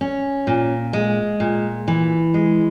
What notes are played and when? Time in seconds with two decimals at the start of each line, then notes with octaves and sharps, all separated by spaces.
0.01 C#4
0.47 A#2
0.93 G#3
1.40 A#2
1.88 E3
2.34 G#3